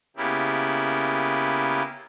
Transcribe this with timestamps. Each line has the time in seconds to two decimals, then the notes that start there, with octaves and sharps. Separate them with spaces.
0.17 C#3 A#3 B3 E4 G4